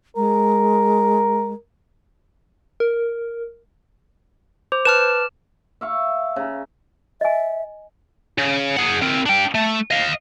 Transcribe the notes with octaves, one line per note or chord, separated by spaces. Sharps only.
G#3 A#4
A#4
C5 D6
B4 A5 F6 E7
E5 F5 C#6
C#3 A#5
D#5 E5 G#5
C#3
G#4 F#5
C4 A#4
D4 G5
A3
D#5 F5